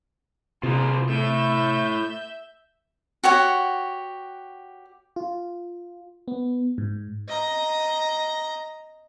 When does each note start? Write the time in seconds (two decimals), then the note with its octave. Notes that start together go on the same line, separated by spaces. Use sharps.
0.63 C3 F4 G#4 C5 A#5
1.09 A2 E5 G6
3.24 F#4 G4 C#5 F#5
5.16 F4
6.28 B3
6.78 G#2
7.28 D#5 A#5